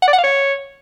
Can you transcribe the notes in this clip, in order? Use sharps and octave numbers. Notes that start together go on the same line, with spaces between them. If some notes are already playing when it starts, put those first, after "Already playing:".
F#5
D5
F#5
F5
C#5